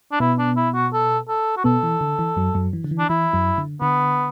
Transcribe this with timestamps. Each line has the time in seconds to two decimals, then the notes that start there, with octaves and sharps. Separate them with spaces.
0.12 D4
0.20 B2 B3 E4
0.39 D4
0.56 E4
0.74 F#4
0.93 A4
1.28 A4
1.57 F#4
1.64 B2 B3 A4
1.83 E3
2.01 D3
2.19 E3
2.36 F#2 F#3
2.55 F#2 F#3
2.73 E3
2.84 D3
2.91 E3
2.99 D4
3.09 E3 E4
3.33 F#2 F#3
3.58 D3
3.81 D3 B3